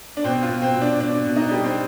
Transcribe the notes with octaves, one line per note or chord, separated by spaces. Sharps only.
D4
B2 C4
F4
B2
C4
B2
D4
B2 D4
B2
D#4
G3 D4
C4